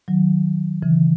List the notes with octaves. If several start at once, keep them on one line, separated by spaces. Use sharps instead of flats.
D#3 F#3
C#3 E3